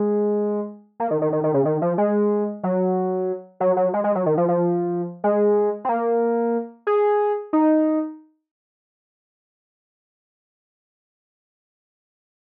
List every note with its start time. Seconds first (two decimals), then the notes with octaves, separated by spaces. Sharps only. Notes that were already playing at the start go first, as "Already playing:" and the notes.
Already playing: G#3
1.00 A#3
1.11 D#3
1.22 D#3
1.33 D#3
1.44 D#3
1.54 C#3
1.65 D#3
1.82 F3
1.98 G#3
2.63 F#3
3.60 F#3
3.77 F#3
3.94 G#3
4.04 G#3
4.15 F#3
4.26 D#3
4.38 F3
4.48 F3
5.24 G#3
5.85 C4
5.89 A#3
6.87 G#4
7.53 D#4